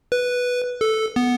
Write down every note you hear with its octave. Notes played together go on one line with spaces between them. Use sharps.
B4
A4
B3